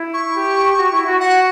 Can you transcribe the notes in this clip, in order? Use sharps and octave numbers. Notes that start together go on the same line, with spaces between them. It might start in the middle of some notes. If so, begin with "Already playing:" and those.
Already playing: E4
C#6
G4
F#4
E4
F#4
F#4 F#5